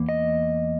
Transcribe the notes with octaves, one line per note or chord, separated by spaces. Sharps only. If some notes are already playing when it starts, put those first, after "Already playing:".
Already playing: E2 A#3
D#5